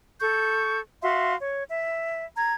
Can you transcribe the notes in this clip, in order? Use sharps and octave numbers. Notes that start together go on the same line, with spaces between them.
A4 C#6 G6
F#4 E5 F5 C6
C#5
E5
A#5 G#6